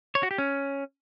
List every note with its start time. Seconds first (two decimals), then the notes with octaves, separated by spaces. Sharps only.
0.15 C#5
0.23 F#4
0.31 G4
0.38 C#4